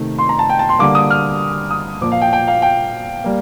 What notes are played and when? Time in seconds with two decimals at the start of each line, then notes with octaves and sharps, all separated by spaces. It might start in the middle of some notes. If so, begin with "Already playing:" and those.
Already playing: C3 D#3 A3
0.19 C6
0.29 A#5
0.39 A5
0.49 G5
0.59 A5
0.69 C6
0.79 D3 G3 A#3 D6
0.95 D#6
1.10 F6
1.71 D#6
2.01 A#2 F3 A#3 D6
2.12 F5
2.21 G5
2.33 G5
2.48 F5
2.62 G5
3.24 G3 A#3